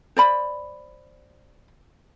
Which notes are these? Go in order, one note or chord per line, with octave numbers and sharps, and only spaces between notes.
C5 D5 B5